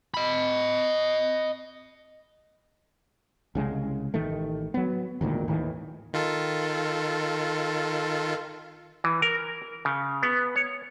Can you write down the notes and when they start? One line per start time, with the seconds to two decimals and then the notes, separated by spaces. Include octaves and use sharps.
0.14 D#5 B5
3.55 C2 C#3 G#3
4.14 A1 D#3 A3
4.74 F#3 B3
5.21 G#1 D2 A#2 D#3
5.48 D#2 A2 D#3 E3
6.13 D#3 F4 A4
9.04 E3
9.22 A#4
9.85 C#3
10.23 B3
10.56 C#5